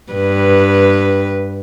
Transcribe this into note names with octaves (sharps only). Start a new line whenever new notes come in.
G2 B4